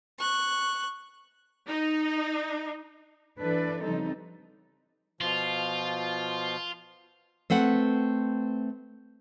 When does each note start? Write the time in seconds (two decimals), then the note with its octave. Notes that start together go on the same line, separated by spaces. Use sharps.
0.19 C#6 F#6
1.67 D#4
3.39 E3 D4 A4 B4 D5
3.82 C#3 F3 G3 C4 D#4 A4
5.21 B2 F3 F4
7.50 A3 C4 B4 F#5